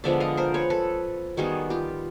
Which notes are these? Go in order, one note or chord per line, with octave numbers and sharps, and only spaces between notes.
D3 F3 G#3 B3 D5 E5
D#5 F5
A#4 C5
B4 C#5
A4 B4
D#3 G3 B3 F#4 G#4
F4 G4